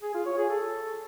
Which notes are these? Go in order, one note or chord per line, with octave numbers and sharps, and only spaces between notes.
G#4
F4
C#5
G#4
A4